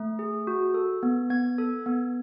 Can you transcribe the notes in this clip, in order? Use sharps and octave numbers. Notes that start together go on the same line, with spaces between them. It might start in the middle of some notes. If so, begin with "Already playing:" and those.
Already playing: A3
G#4
F#4
A4
B3
B3 G#6
A4
B3